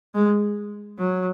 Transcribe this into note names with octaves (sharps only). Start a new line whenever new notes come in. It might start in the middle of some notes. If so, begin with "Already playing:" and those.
G#3
F#3